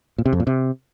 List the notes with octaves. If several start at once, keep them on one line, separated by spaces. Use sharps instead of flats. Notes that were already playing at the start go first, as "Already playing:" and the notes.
A#2
C3
F2
A#2
C3